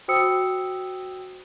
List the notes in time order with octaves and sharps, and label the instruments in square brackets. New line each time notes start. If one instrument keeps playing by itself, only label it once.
[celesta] F#4 C5 G5 D#6 E6 C#7